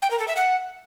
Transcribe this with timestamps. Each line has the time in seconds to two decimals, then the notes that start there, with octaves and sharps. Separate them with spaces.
0.02 G5
0.11 A#4
0.19 A4
0.28 E5
0.36 F#5